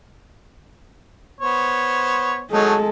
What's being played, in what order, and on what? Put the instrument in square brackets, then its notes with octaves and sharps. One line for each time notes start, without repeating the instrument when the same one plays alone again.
[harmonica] B3 C5 C#5
[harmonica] F#3 A3 D#4 [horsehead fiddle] G#3 A4